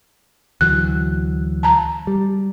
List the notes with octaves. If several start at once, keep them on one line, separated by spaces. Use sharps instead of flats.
D2 E3 F#3 F#6
A5 A#5
G3